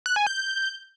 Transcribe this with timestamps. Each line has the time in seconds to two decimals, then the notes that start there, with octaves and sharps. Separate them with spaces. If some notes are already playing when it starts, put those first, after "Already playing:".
0.06 F#6
0.16 G#5
0.27 G6